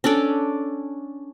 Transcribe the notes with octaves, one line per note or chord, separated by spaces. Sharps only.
C#4 D4 A4 D5